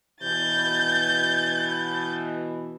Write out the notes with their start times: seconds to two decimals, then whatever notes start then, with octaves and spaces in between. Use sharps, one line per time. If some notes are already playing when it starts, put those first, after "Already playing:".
0.23 B2 E3 G6 A6